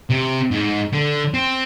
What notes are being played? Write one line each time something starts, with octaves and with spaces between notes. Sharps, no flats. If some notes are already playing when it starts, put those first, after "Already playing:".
C3
G#2
D3
C4